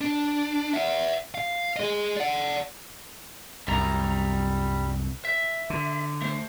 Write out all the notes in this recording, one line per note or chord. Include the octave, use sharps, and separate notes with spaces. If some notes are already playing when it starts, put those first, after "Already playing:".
D4
E5 F#5
F5
G#4 D#5
D5 F#5
C2 F#2 G3 A#5
E5
D3
A3 C5